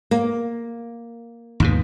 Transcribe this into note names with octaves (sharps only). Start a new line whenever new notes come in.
A#3
D#2 G#2 B2